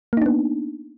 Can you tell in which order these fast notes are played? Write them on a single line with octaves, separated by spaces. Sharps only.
A#3 D#4 D4 B3